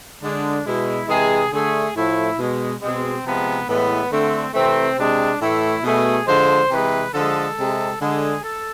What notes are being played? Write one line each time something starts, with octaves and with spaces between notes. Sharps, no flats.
D3 G#3 D4
B2 G#3 E4
C3 E3 G#3 G#4
D3 A3 G#4
A2 F3 A3 E4
B2 G#3
B2 G#3 C4
C3 F3 G#3 B3
A2 E3 G#3 B3
D3 A3 C4
C3 E3 A3 C4
C3 G#3 D4
A2 E3 A3 E4
B2 A3 G#4
D3 F3 G#3 C5
C3 E3 G#3 B4
D3 F3 G#3 A4
C3 G#3
D3 G#3 G#4
A4